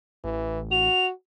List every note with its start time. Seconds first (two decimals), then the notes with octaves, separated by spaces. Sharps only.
0.24 A1 E3
0.71 F#4 F7